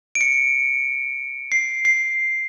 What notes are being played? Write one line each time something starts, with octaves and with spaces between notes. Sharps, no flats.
D7
C#7
C7
C7